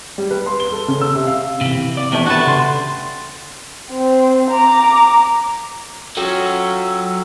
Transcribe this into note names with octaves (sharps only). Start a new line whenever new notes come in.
G3
B4
C6
G7
A4
C#3
E6
C3
F5
C3 E3
D5
C3 E3 A3 B3
D4 F#4 B4 A5
C#3 C6
C4
A#5 D6
F#3 C#4 F4 A4 G5 E6